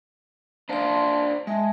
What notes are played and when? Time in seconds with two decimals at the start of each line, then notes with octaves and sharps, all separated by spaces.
0.69 D4 C5 F5 A5 C6
1.47 G#3 E5 G#5 A5